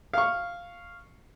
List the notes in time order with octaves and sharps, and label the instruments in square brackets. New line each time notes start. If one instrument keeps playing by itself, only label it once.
[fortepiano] F5 C#6